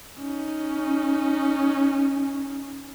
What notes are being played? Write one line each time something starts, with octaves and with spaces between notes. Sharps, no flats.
C#4 D#4